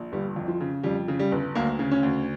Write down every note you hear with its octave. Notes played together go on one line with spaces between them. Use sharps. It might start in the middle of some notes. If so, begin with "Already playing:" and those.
Already playing: A#1
G1 G3
F2
F3
C#3
F2 G3
C#3
G3
G1
D2 A#3
C#3
C#4
D2